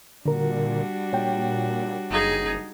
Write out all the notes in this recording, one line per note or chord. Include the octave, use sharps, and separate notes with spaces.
A#2 D3 G3 D4 F#4 A#4
A#2 C#5 G5
F#1 D#4 G#4